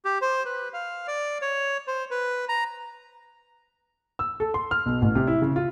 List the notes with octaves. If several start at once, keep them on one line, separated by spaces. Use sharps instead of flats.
G4
C5
B4
F5
D5
C#5
C5
B4
A#5
E6
A4
C6
F6
B1
A1
C3
E4
C#3
F4